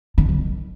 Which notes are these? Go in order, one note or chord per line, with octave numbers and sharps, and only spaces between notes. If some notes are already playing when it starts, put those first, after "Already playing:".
D3
F3
D#3